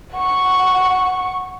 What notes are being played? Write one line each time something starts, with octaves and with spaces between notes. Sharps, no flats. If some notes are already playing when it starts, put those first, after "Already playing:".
F#5 C#6